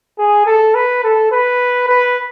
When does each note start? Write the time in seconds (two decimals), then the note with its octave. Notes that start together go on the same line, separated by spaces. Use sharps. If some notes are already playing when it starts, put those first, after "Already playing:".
0.19 G#4
0.46 A4
0.75 B4
1.03 A4
1.32 B4
1.88 B4